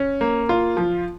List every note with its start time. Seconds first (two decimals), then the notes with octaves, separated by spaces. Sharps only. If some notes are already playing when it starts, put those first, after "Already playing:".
Already playing: C#4
0.21 A#3
0.49 F4
0.77 F3